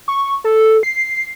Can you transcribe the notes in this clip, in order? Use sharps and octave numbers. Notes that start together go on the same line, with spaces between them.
C#6
A4
C7